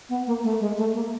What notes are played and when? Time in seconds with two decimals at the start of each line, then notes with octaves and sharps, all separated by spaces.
0.09 B3
0.27 A#3
0.44 A3
0.60 G#3
0.77 A3
0.94 A#3